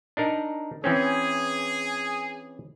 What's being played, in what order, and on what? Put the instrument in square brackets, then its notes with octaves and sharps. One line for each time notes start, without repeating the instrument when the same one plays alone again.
[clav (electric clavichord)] D4 D#4 A#4
[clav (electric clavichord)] E3 C4 C#4 [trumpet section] G#4